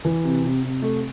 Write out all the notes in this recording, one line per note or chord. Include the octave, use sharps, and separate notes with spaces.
E3
C3
C3
C3
A3